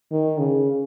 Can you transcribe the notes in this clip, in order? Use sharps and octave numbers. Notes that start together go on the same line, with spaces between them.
D#3
C#3